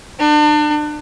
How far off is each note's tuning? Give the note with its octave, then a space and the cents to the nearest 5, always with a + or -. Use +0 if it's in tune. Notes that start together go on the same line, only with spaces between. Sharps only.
D4 +35